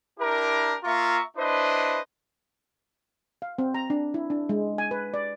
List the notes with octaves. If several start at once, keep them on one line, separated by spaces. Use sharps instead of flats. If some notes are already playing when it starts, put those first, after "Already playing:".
D4 E4 G4 A#4
A#3 F4 E5 A#5 C#6
D4 E4 B4 C5 D#5
F5
C4
A#5
D4
E4
D4
G#3
G#5
B4
D5